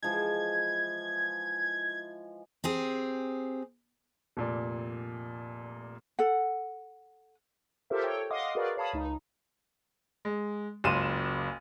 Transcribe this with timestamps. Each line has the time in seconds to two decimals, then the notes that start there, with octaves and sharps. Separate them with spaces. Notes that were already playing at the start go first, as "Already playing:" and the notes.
0.02 E3 F3 G#3 G#6
2.64 C4 G4 G#4
4.37 F1 A#2 D5
6.19 A4 F#5
7.90 F4 G4 A4 A#4 C5 E5
8.04 A4 C#5 G5
8.31 D#5 F5 F#5 C6 D6 D#6
8.55 F#4 G#4 A#4 B4 D5 F5
8.77 C#5 F5 A5 B5 D#6
8.93 C#2 D#4
10.25 G#3
10.84 F#1 C#2 C6 D#7 E7